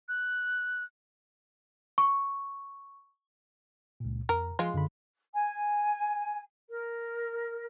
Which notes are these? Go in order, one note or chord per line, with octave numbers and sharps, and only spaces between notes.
F#6
C#6
C#2 A#2
F2 A#4
F3 G#3 F4
F#2 D3 B5
G#5
A#4